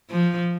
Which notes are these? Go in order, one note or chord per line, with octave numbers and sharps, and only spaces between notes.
F3